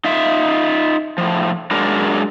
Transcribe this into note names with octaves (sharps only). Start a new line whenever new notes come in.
D#4 F4 E5
A2 F3
F#3 G#3 D4 A#4